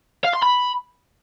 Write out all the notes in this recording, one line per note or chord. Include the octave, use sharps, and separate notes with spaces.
F5
C6
B5